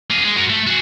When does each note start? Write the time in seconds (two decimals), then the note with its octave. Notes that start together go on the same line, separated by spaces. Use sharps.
0.10 A#3 G#4
0.24 G#3
0.37 F#4 A#4
0.50 A3
0.67 F#4 G#4